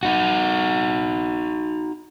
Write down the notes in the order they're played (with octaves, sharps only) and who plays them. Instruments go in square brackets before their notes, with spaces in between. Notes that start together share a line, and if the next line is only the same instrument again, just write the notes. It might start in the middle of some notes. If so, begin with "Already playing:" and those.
[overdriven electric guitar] D#4 F#4